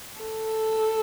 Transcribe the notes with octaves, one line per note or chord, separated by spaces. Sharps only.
A4